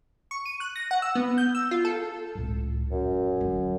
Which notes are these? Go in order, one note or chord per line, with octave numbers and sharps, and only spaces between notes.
C#6
D#7
F#6
A#6
F#5
E6
B3
G6
E6
F4
A4
C#2 A2
D#1 F#2
D3 F#3